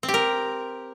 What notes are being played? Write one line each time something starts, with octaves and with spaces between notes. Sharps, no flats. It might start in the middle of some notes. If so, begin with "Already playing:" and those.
C4
G4
A#4